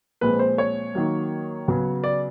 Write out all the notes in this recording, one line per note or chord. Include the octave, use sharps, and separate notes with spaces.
A#2 F3 G#3 C4 B4
C5
C#5
D#3 F#3 A#3
C#3 F#3 B3
D5